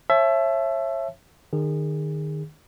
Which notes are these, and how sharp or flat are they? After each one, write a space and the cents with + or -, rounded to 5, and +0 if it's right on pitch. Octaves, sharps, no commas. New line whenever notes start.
C#5 -35 E5 +20 A5 -30
D#3 -30 G#4 -30